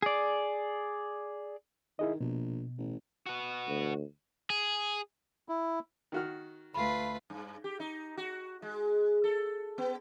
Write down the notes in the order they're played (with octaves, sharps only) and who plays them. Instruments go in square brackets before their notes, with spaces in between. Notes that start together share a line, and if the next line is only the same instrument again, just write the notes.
[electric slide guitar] G#4 D5
[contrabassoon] D#3 [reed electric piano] E4 G#4 D#5
[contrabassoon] A#1 [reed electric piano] B2
[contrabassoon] A1
[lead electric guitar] F#4 B4
[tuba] D2
[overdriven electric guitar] G#4
[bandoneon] E4
[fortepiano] D#3 F#4 F6
[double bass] D2 A3 [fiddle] F4 B4 [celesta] B5 C7
[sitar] G2
G4
D#4
F#4
G#3
A4
B3